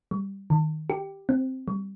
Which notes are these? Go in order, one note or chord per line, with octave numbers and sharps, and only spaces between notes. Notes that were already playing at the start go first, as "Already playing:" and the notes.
G3
D#3
G4
C4
G3